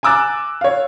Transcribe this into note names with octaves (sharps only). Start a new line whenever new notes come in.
G#5 A#5 D6 E6 F#6 A6
C#5 F5